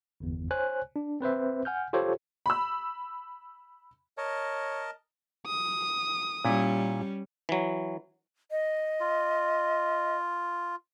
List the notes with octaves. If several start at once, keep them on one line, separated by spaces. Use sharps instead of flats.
G1 E2
C5 C#5 G#5 F#6
D4
C4 B4 C5 E5
F#5 G#5 F6 G6
F4 G4 A4 C5 C#5
B5 E6
A#4 C#5 D#5 A5
D#6
A#2 G3 C#4 E4
E3 F#3
D#5
F4